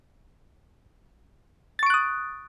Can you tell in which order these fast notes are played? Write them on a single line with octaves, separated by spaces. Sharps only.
A6 C#6 D7 F#6 D#6